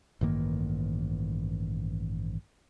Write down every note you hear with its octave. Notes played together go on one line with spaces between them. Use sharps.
A1 G2 D#3 A#3